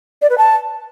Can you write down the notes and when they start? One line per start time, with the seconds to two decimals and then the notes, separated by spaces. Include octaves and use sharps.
0.22 D5
0.30 B4
0.38 A5